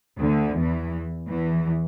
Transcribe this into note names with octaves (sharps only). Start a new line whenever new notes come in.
D2 D3
E2 E3
E2 E3